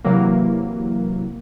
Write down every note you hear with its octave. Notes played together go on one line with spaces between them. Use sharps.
C3 E3 F#3 A#3